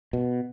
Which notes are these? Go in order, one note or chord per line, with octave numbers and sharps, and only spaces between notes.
B2